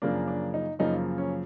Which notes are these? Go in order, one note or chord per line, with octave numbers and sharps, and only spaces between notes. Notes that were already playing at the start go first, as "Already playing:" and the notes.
F#2 C#3 F3 A#3 D4
D4
D#4
F#2 C#3 F3 A#3 D#4
C#4